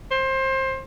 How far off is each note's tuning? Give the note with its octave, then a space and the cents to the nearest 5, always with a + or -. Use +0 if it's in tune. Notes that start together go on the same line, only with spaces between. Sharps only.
C5 +25